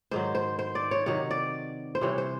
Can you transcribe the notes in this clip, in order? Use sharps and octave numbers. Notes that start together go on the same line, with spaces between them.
G#2 D#3 F#3 C5
C5
C5
D5
C#5
C3 D#3 F#3 C#5
D5
C5
C3 E3 G3 C#5
C5